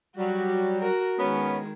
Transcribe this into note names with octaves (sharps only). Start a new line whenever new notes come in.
F#3 G3 F#4
F#4 A#4
D#3 G#3 B3 C#4